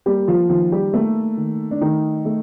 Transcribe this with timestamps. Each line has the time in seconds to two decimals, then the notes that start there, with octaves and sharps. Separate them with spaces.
0.06 G3 A#3 G4
0.28 F3 F4
0.50 D#3 F3 F4
0.72 G3 G4
0.93 A3 A#3 A4
1.37 D#3
1.71 D4
1.81 D#3 A3 D#4
2.25 A3